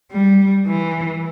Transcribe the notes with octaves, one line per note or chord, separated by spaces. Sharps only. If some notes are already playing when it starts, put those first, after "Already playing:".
G3
E3